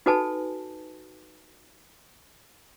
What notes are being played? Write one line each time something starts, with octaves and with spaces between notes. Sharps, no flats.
D#4 F#4 A4 B4 G#5 A5